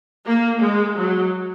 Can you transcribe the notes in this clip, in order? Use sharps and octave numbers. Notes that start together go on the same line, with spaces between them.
A#3
G#3
F#3